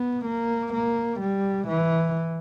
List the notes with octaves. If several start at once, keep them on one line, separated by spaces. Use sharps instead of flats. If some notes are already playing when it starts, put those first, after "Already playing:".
Already playing: B3
A#3
A#3
G3
E3